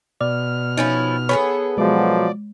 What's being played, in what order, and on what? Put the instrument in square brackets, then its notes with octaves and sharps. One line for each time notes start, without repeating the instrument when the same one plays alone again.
[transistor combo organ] B2 F6 [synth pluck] D5
[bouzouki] F3 C#4 E4 [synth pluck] D#4
[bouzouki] B3 G#4 A4 [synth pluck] C#5 B5
[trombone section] B2 F3 F#3 [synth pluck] G#3 [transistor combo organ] D5